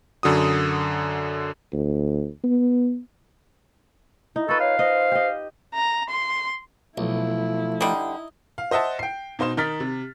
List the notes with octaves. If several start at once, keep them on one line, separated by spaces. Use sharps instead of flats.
F#2 D3 F#4 D#6
D2
B3
D#4 E4
F4 A4 B4 C#6
C#5 F5
C5 D#5
G4 D#5
A#5
C6
B1 F3 A3 E4
D3 G3 D#4
F5
C5 D#5 E5 F#5 A5
G5 C7
B2 D#4 C5 C6 E7
D#3 D#4 A#4 F6 A6 B6
C3